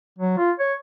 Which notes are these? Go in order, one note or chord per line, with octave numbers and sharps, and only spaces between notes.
F#3
F4
C#5